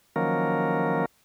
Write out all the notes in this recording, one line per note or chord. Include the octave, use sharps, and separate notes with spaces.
D#3 F3 F#3 A#3 C#4 A#4